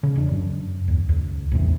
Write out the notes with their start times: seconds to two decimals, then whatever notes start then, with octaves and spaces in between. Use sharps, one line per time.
0.03 C#3
0.16 E1 D4
0.32 F#2
0.88 D#2
1.09 C#2
1.51 A1 E2 C3